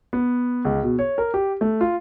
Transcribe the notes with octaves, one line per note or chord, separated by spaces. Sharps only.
B3
C#2
B2
C#5
A#4
G4
A3
F4